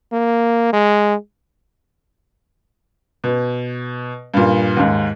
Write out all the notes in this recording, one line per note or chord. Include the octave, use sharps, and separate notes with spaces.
A#3
G#3
B2
G2 A#2
D#2 G#2